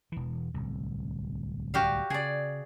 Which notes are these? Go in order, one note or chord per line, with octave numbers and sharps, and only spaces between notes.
E1 E3
D1 C2
F#4 G4 F5
C#3 G#4 D5